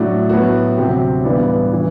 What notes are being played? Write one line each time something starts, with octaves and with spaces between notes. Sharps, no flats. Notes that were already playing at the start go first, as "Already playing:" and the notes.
Already playing: A2 F#3 A3 D4 F#4
A2 F#3 B3 F#4
D2 C3 F#3 C4 G4
A1 G2 E3 B3 D4
E3